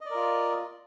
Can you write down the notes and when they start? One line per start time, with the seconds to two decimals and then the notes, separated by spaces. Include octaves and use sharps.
0.01 D#5
0.06 D5
0.10 A#4
0.15 F4